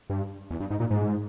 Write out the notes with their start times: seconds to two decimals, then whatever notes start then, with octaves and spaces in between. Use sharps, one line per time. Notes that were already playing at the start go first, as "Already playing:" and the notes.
0.10 G2
0.51 E2
0.60 G2
0.71 G#2
0.80 A#2
0.90 G#2